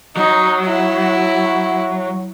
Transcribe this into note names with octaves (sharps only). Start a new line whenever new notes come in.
F#3 D#4
E4